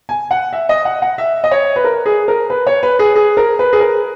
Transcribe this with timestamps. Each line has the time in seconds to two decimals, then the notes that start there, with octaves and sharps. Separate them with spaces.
0.09 G#5
0.31 F#5
0.53 E5
0.69 D#5
0.85 F#5
1.02 F#5
1.18 E5
1.44 D#5
1.51 C#5
1.76 B4
1.84 A#4
2.06 G#4
2.28 A#4
2.50 B4
2.67 C#5
2.83 B4
2.99 G#4
3.16 G#4
3.37 A#4
3.59 B4
3.73 G#4
3.80 A#4